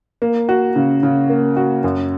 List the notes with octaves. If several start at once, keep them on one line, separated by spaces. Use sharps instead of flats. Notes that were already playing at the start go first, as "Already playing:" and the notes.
A#3
F#4
C#3
C#3
A#3
F#4
F#2